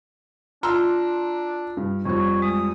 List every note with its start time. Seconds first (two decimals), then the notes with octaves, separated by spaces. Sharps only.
0.63 D4 F4 A#5 C6 E6
1.77 G2
2.06 F2 G3 C#5
2.42 G#3 D#6